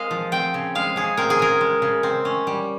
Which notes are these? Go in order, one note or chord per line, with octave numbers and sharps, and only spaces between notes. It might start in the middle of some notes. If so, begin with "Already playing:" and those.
Already playing: G#3 C4 A#4 D#5 F5
F3
C4 G5
C#3
G#3 F5
C#3 G#4
C4 A#4
G#4
C#3 A#4
G#3
C#3
C4
C#4
G3